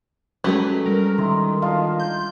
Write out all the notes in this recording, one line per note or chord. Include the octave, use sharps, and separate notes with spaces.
F#3 G#3 A3 C#4 G4 B4
G3 A#4
D#3 E4 A#5 C6
D4 F4 D#5 F5 A5
G6